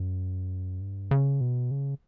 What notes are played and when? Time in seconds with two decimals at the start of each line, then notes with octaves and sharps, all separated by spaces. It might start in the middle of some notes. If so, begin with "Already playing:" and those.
Already playing: F#2
0.81 G2
1.11 C#3
1.41 B2
1.71 C#3